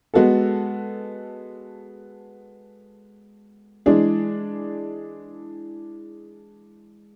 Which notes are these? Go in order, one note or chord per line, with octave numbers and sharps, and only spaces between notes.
G#3 B3 F#4 A4
E3 G#3 D4 G#4